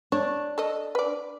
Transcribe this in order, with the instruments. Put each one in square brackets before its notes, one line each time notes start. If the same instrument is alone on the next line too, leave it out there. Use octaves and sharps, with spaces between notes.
[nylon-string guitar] D4 [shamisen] C#5
[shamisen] A4 D#5
B4 D5